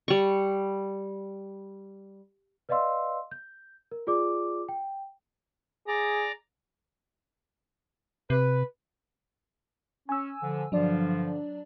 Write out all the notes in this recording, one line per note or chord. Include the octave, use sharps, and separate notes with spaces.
G3 C#6
B4 D5 D#5 F5 C6 E6
G6
A#4
F4 G#4 D5 D6
G5
G#4 D5 A#5
C3 B4
C#4 G#5 E6
D3 F3
G2 D3 F3 F#3 D4 D5